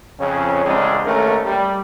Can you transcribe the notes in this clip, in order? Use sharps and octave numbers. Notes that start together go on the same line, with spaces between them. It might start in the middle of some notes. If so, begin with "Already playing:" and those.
F2 C#3 C#4
A1 C#3 G#3 C4 D4 G#4
G#1 D#2 A3 C#4 A#4
G3